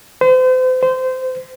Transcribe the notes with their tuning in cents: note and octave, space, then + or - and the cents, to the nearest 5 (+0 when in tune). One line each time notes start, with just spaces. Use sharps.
C5 -40
C5 -25